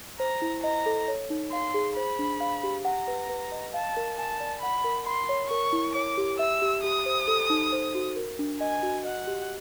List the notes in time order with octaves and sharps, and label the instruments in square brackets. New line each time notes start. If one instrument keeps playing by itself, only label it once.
[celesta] C5 [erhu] A#5
[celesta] E4
[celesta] D#5 [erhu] A#5
[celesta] A4
C#5
D#4
[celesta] F5 [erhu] C6
[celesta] G#4
[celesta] C5 [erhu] B5
[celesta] D4
F5
G4
[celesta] F#5 [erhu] A#5
[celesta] B4
B4
D#5
[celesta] F5 [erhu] A5
[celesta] A#4
[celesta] G#5 [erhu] A5
[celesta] D5
[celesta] F#5 [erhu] B5
[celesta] A#4
[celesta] B5 [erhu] C6
[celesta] C#5
[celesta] A#4 [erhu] C#6
[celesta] E4
[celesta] C#5 [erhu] D6
[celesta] G4
[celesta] E5 [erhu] E6
[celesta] G4
[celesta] G4 [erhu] D#6
[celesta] C5
A4
D#4
C5
F#4
A#4
D4
[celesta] D#5 [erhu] G#5
[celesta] F#4
[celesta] D#5 [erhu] F#5
[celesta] G4